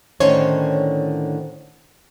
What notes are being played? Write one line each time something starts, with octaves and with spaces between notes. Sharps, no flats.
A2 D3 D#3 C#4 C5 C#5